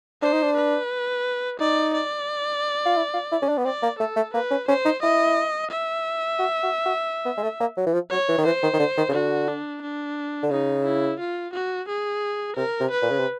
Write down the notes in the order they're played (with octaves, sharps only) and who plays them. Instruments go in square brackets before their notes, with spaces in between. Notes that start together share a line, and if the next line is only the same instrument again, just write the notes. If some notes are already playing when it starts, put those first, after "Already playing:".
[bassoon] D4 [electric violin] C5
[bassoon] D#4
D4
[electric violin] B4
[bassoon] D#4 [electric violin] D5
[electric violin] D5
[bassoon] F4
E4
F4
E4
C#4
D4
B3
[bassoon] C4 [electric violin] D5
[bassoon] A#3
[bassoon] A3 [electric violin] A4
[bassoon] A3
[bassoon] A#3 [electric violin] B4
[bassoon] C#4
[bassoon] C#4 [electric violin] C5
[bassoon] D#4
[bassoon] E4 [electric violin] D#5
[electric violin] E5
[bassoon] F#4
F#4
F#4
B3
G#3
A3
A#3
F#3
E3
F3
[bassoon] F#3 [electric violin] C#5
[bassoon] E3
D#3
[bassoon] E3 [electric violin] C5
[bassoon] D#3
D#3
D3
D#3
C#3
[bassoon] D3 [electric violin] F#4
[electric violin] D4
D4
[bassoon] D3
[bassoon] C#3 [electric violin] D#4
[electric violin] E4
F4
F#4
G#4
[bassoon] C3 [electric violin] A#4
[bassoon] C3
[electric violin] B4
[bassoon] A#2
C#3
C3